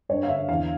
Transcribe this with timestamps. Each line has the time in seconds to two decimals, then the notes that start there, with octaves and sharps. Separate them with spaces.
0.09 G2 C#5
0.23 F5
0.29 D3 E5
0.49 E2 F5